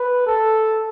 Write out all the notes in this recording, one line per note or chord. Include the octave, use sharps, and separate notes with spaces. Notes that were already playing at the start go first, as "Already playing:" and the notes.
Already playing: B4
A4